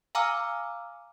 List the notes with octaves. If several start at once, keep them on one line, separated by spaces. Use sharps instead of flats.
F5 G#5 A#5 D6 E6 F6